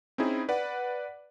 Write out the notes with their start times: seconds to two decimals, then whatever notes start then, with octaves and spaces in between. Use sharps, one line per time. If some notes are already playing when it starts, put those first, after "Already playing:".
0.18 C4 C#4 D#4 E4 G#4
0.49 B4 D5 F#5